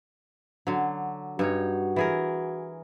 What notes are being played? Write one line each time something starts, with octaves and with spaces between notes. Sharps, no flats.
D3 F#3
G2 D#4 F#4 C#5
E3 G#4 A#4